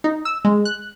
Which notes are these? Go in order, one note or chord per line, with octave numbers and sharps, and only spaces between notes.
D#4
E6
G#3
F#6